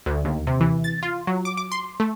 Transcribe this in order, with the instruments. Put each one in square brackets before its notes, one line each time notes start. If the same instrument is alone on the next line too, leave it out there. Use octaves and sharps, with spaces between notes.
[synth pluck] D2
D#2
C3
E3
A6
F4
F#3
D6
D6
C6
A3